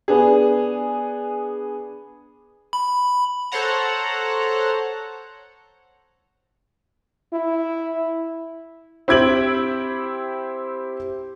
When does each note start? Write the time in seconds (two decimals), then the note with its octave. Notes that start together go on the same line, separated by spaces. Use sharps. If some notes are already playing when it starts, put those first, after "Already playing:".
0.08 B3 D4 G#4
2.73 B5
3.52 A4 C5 C#5 F#5 A#5
7.33 E4
9.08 C4 E4 G4 G#6 D7 F#7